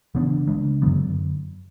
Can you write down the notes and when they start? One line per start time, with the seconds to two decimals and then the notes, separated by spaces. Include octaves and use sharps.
0.15 C#3 E3 B3 D4
0.47 C#3 G#3 D4
0.82 F#2 D3 F#3 B3